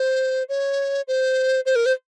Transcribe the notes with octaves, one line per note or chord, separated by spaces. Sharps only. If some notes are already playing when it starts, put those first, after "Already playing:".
Already playing: C5
C#5
C5
C5
A#4
C5